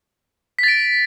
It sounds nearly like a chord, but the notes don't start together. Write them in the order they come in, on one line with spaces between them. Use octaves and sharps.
B6 A6 D7